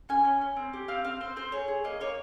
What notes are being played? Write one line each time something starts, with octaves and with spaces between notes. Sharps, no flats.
C#4 G#5
C#4
C#4
C4
G4
C4 F5
C4 F5
C4 C5
C4 C5
G#4 C#5
G#4
A#3 D#5
A#3 C#5